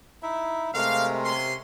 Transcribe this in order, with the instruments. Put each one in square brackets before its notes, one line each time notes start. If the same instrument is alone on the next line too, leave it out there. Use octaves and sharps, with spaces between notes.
[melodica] D#4 E4 E5
[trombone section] C3 [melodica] G#3 A3 A#4 [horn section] F5
[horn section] C#4 C6